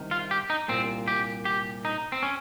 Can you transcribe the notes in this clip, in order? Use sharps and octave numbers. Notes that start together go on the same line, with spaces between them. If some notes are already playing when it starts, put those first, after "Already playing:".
Already playing: C2 C3 D#3
F4
G4
D#4
C2 A#2 C4
G4
G4
D#4
C4
C#4